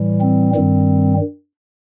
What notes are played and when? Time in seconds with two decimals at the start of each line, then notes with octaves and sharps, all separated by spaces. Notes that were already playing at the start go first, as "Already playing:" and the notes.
Already playing: A2 E3 G3
0.21 C4
0.55 G2 D#3 G3 C4